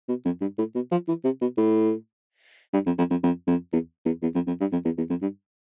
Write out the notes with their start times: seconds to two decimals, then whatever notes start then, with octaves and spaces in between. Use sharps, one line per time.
0.09 B2
0.25 F2
0.41 G2
0.58 A2
0.75 B2
0.92 F3
1.08 E3
1.25 C3
1.41 B2
1.58 A2
2.73 G2
2.86 F2
2.98 F2
3.11 F2
3.23 F2
3.48 F2
3.73 E2
4.06 E2
4.22 E2
4.35 F2
4.47 F2
4.60 G2
4.72 F2
4.85 E2
4.98 E2
5.10 F2
5.22 G2